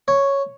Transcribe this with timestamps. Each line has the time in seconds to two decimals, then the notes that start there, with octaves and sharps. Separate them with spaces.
0.08 C#5